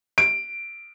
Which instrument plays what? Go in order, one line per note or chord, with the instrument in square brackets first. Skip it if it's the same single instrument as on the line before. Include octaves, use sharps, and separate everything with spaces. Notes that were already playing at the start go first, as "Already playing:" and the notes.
[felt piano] D7